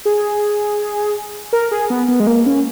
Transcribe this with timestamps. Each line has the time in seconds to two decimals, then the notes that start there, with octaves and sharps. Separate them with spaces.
0.05 G#4
1.53 A#4
1.71 G#4
1.90 B3
2.08 B3
2.20 G#3
2.27 A#3
2.46 C#4